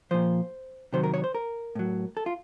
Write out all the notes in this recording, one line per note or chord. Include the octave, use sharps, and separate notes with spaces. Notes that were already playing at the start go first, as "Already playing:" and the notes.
A#2 F3 C5
C3 D#3 F#3 C5
A#4
C#5
C5
A#4
A2 F#3
A4
F4